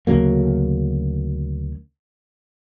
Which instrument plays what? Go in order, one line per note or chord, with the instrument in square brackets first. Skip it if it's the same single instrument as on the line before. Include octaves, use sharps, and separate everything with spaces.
[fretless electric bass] D2 C#3 F#3 A#3